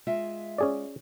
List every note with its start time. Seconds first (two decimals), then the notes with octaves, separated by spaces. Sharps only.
0.07 G#3 F4 E5
0.58 C#4 G#4 D5